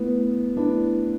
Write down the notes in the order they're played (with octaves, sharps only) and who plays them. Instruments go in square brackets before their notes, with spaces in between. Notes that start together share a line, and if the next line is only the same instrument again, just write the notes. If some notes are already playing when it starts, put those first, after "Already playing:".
Already playing: [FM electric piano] A3 E4 B4 [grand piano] B3
[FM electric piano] A3 E4 B4 [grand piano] D4